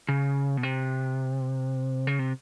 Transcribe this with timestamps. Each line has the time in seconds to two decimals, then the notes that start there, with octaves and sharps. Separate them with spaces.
0.09 C#3
0.57 B2
0.63 C3
2.07 C#3
2.19 C3